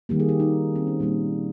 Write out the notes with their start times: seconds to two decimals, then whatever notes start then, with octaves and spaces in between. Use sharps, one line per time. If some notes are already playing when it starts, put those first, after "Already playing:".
0.09 D#3 G3 A#3 G4
0.20 G#4
0.29 G4
0.40 D#4
0.76 C4
0.87 C#4
1.00 A#2 G3 A#3 D#4